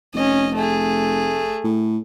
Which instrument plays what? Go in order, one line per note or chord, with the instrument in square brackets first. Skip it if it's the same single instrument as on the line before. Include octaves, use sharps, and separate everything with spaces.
[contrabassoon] F1 [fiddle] C#4 D#5
[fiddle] A3 G#4
[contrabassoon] A2